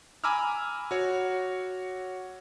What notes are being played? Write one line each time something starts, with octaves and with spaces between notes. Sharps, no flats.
G#5 A#5 B5 D6 E6 F6
F#4 C#5